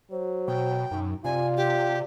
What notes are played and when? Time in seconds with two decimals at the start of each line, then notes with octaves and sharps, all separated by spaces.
0.12 F#3 C5
0.48 B2 G5
0.91 F#2 D#4
1.25 C3 F4 D5 G#5
1.57 G4